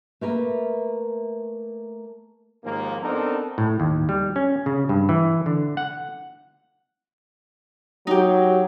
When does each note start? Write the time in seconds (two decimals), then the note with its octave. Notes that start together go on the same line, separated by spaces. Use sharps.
0.21 A3 A#3 A#4 B4
2.64 D#2 G#2 F3 A#3
3.03 B3 C4 D4 D#4 A4 A#4
3.58 A2
3.80 D#2
4.09 G3
4.36 C#4
4.66 C#3
4.89 G2
5.09 E3
5.46 D3
5.77 F#5
8.07 F#3 D#4 G4